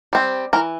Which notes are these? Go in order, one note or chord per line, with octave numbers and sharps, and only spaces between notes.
G3 C4
E3 A#4